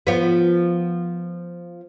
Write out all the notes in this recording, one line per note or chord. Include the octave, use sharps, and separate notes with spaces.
F3 B3